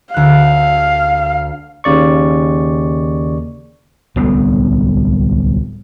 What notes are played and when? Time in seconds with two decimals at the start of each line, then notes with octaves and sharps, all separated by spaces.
0.14 D2 F5 F#6
1.84 D#2 C#3 D5 C#6
4.16 D1 C2 A2 B3